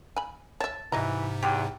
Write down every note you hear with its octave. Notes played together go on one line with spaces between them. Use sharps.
G#5 B5
C#5 E5 A5
G#2 C3 E3 F#3 D#5 A#5
E2 G4